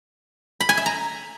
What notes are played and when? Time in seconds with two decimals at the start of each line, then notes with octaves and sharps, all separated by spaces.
0.60 B5
0.69 G#5
0.77 E5
0.86 A#5